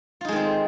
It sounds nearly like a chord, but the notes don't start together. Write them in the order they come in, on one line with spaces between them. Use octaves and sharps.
F4 D#4 G#3 D#3 C4